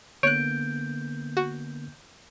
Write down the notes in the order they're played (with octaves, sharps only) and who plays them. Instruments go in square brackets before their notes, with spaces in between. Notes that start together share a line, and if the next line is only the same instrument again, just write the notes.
[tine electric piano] D3 A#3 B3 [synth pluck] C#5 F#6 [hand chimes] G6 [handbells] D7
[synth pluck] F#4